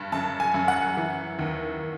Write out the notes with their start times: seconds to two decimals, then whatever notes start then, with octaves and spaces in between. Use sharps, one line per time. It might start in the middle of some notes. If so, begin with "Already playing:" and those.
Already playing: G2
0.12 F#2 A5
0.40 G#5
0.54 F#2
0.68 F#5
0.97 E3
1.39 D#2